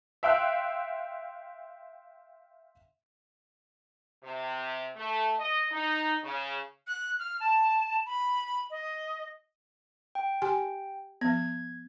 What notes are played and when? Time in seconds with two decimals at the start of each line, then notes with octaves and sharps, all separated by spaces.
0.23 E5 F5 G5 C6 E6 F#6
4.24 C3
4.95 A3
5.38 D#5
5.72 D#4
6.23 C#3
6.87 F#6
7.19 F6
7.40 A5
8.06 B5
8.70 D#5
10.15 G5
10.42 G4 G#5 C6
11.21 F3 B3 G#6